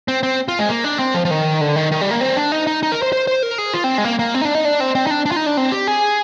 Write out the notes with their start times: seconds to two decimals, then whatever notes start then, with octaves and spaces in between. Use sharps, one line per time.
0.08 C4
0.23 C4
0.48 F4
0.59 G#3
0.69 A#3
0.84 D4
0.99 C4
1.15 F3
1.25 F3
1.31 D#3
1.61 D3
1.76 D#3
1.91 D#3
2.01 G3
2.11 A#3
2.21 C4
2.37 D4
2.52 D#4
2.67 D#4
2.83 D#4
2.92 A#4
3.02 C5
3.13 C5
3.27 C5
3.43 A#4
3.58 G#4
3.74 F4
3.84 C4
3.98 G#3
4.04 A#3
4.19 A#3
4.35 C4
4.41 D#4
4.45 D4
4.55 D#4
4.65 D4
4.80 C4
4.95 C4
5.07 D#4
5.11 D4
5.26 D4
5.32 F4
5.36 D#4
5.46 D4
5.57 C4
5.72 G4
5.87 G#4